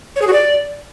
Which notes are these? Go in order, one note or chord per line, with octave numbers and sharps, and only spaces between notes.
C#5
G#4
F#4
D5